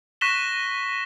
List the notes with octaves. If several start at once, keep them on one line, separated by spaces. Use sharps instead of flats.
C#6 F#6 A#6 B6 E7 G7